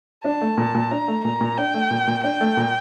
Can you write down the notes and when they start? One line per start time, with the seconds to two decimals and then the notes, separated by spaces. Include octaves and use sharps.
0.24 D4 A5
0.41 A3
0.58 A#2
0.75 A#2
0.91 D4 A#5
1.08 A3
1.25 A#2 A#5
1.41 A#2
1.58 D4 G5
1.74 A3
1.91 A#2
2.07 A#2
2.24 D4 G5
2.41 A3
2.57 A#2